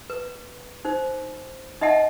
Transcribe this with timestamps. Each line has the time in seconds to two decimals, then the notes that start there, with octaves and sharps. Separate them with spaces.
0.10 B4
0.85 D#4 C5
1.81 D#4 D#5 E5 F#5 A5